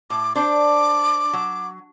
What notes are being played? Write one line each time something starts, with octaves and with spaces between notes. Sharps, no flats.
A2 D6
D4 C5 D6
F#3